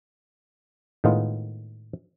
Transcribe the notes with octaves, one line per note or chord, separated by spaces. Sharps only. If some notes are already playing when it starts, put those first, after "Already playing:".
A2 D#3 G#3 B3 D#4 F4